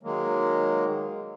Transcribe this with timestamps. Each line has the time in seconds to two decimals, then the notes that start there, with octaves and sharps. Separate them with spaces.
0.03 D#3 F#3 G#3 A#3